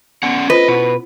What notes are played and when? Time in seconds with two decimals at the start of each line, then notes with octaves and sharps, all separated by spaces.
0.23 B3 C#4 D5 F#5
0.50 C#4 F4 B4 C5 D#5
0.68 B2 E4 F#5